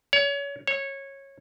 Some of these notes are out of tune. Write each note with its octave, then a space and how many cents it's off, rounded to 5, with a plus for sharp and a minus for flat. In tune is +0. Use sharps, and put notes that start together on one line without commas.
C#5 +30
C#5 -15